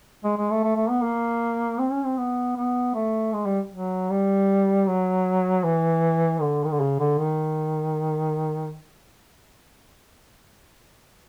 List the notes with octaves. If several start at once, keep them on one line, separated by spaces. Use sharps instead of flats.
G#3
G#3
A3
A3
A3
B3
A#3
C4
C#4
C4
B3
B3
A3
G#3
G3
F#3
G3
F#3
E3
D3
D#3
D3
C#3
D3
D#3